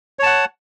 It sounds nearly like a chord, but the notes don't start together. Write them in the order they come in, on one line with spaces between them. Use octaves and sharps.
C#5 A5 F#5